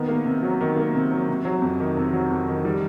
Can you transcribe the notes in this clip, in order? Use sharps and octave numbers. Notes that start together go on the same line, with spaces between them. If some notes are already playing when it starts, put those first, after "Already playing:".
Already playing: D#3 B3
A#3
C3
F#3
D#3
A#3
C3
F#3
C3
F#3
F2
D#3
C3
F#3
F2
D#3
G3